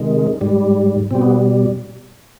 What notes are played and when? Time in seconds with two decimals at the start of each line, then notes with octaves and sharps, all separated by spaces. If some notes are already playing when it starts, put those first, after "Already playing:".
Already playing: C3 D#3 G#3
0.41 G#2 G3
1.11 B2 G3 C4
1.21 B3